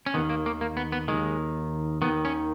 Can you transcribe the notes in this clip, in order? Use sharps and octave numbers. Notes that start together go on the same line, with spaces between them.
C#4
D#2 D#3 B3
A#3
A#3
A#3
B3
B3
D#2 D#3 G#3
D#2 D#3 B3
C#4